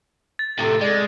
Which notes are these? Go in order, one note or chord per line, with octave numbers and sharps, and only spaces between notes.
A6
A2 C3 A4
G#3 D5